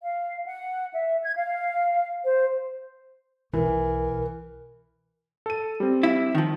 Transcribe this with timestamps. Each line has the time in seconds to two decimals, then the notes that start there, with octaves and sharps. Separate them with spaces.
0.03 F5
0.46 F#5
0.94 E5
1.23 G#6
1.37 F5
2.24 C5
3.53 B1 E3 A#4
5.46 A4 D#7
5.80 G3 C4
6.03 E4
6.35 D#3 F3